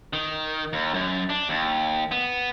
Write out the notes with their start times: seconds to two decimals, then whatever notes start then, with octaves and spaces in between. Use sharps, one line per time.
0.13 D#3
0.73 D#2
0.94 F#2
1.29 D4
1.49 D#2
2.11 B3